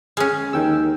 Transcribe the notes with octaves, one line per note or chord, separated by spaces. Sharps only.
G#3 C#4
D#2 D#3 G5 E6